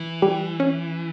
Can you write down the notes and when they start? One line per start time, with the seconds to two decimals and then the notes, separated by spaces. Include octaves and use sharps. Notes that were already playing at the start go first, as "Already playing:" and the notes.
Already playing: E3
0.22 G3
0.60 C#4